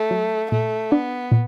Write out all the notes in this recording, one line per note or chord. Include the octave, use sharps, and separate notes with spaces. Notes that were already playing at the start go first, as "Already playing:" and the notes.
Already playing: A3
F#3
A#2 A3
B3 D4
A#2